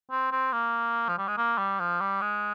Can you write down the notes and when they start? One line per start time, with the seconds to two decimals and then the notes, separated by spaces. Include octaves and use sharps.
0.11 C4
0.32 C4
0.53 A#3
1.08 F3
1.18 G3
1.28 G#3
1.38 A#3
1.58 G3
1.80 F3
2.01 G3
2.22 G#3